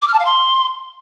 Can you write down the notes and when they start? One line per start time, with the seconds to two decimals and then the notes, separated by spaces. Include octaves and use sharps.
0.02 D6
0.07 F6
0.13 A5
0.19 F5
0.25 C6